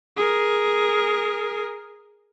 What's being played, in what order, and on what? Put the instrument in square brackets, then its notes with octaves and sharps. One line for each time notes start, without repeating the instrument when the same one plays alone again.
[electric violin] G#4 A#4